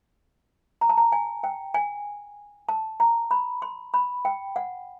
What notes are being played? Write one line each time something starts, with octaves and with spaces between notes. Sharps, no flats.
A#5
A5
A#5
G#5
G5
G#5
A5
A#5
B5
C6
B5
G5
F#5